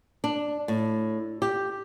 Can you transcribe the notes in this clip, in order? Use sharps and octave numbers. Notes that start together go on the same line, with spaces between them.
D4
A2
G4